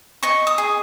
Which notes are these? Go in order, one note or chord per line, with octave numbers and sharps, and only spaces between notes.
D#5 C#6
D#6
G#4